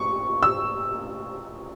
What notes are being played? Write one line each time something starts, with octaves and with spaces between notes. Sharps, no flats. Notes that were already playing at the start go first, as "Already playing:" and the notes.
Already playing: C#6
E6